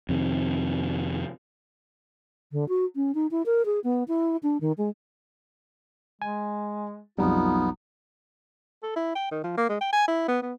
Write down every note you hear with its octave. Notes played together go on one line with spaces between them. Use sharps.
F2 C3 D#3
D3
F#4
C#4
D#4
E4
A#4
G#4
B3
E4
D4
D#3
G#3
G#3 G#5
B1 F2 G3 B3 D#4 F4
A4
E4
G5
D#3
F3
A#3
G#3
G5
G#5
E4
B3
B3